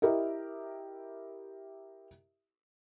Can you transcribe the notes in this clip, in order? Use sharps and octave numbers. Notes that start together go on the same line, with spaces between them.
E4 G4 A#4 D#5 E5